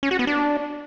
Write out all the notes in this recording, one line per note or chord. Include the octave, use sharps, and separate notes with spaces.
C#4
F#4
B3
D4